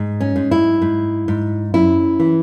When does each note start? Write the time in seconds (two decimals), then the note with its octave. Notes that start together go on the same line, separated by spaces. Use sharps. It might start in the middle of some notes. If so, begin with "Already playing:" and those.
Already playing: G#2
0.20 C#4
0.36 G#2
0.51 E4
0.82 G#2
1.28 G#2
1.74 F#2 E4
2.20 E3